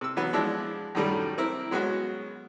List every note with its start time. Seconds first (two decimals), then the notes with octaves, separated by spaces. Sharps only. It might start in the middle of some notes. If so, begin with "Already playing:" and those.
0.01 C3 E6
0.17 E3 F#3 B3
0.33 F3 G#3 D4 E4
0.95 F#2 A2 D#3 G3 A3
1.38 C4 E4 A#4
1.71 F#3 G#3 B3 C#4 F#4